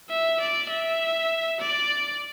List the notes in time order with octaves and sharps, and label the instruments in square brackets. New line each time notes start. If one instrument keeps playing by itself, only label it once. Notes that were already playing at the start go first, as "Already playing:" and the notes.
[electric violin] E5
D5
E5
D5